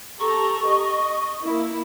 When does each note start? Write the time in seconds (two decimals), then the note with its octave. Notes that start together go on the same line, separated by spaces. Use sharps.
0.20 G4 A4 A#5 C#6
0.67 D#5
1.44 A#3 E4